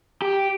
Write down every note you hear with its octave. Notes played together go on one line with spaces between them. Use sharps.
G4